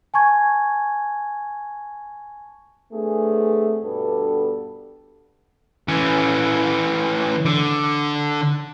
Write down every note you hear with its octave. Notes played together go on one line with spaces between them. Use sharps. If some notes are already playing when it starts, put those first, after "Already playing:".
G#5 A5 C#6 G#6
A3 B3 C4 D4 G#4
G2 B2 B3 D4 A4
E3 C#4
D3